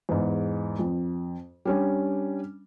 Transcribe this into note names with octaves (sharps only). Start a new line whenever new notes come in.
E2 G#2
F2
G3 C#4 D4